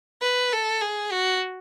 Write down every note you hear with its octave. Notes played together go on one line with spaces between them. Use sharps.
B4
A4
G#4
F#4